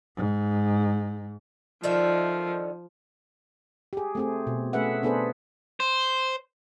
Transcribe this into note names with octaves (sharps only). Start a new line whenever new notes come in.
G#2
D3 D#3 F3 E5
G4 G#4
A3 C4 G#4
B2
A3 C#4 G#4 B4 E5 F#5
B3 D4 G#4 A4 B4 C5
C5